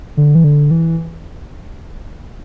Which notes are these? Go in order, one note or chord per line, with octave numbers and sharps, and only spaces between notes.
D3
E3
D3
E3